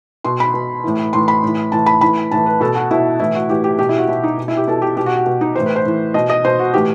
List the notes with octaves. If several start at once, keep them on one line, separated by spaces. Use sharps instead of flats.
B2 C6
B5
B2
A2 E3
A2 E3 C6
B5
A2 E3
A2 E3 A5
B5
A2 E3 B5
A2 E3 A5
B4
B2 A4
F#4
B2 E4
A2 E3 E4
F#4
A2 E3 G4
G4
B2 G4
E4
F#4
B2 E4
D#4
B2
E4
G4
B2 A4
G4
B2 G4
F#4
F#4
B2
D#4
A2 E3 C5
B4
C5
A2 E3
B2 D#5
D#5
B2 C5
F#4
A2 E3 G4